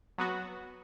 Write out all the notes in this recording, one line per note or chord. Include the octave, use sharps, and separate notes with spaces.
F#3 B3 F#4